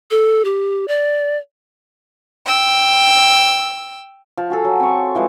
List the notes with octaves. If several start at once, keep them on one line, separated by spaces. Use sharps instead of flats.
A4
G4
D5
G5 E6
F3
F#4 G#4 A4
F#3
C4 C#6
E3 F3 G#3